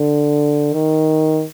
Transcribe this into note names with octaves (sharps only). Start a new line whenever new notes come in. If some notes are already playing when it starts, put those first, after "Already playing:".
Already playing: D3
D#3